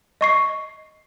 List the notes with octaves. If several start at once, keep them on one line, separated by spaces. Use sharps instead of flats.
D#5 C#6 C7